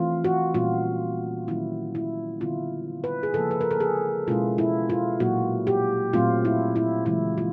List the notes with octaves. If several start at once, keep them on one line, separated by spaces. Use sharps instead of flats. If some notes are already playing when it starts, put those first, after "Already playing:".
Already playing: E3 A3 C4 F4
F#4
A#2 G3 A#3 C#4 F4
D#3 F#3 A#3 C#4 E4
E4
D3 G3 B3 E4 F4
B4
G#4
C#3 F3 A#3 A4
B4
A#4
A4
G#4
B2 G#3 C#4 E4 F4
E4
F4
A#2 F#3 A#3 F#4
G4
A#2 F#3 A3 C4 F4
E4
E4
C#3 E3 G#3 E4
F4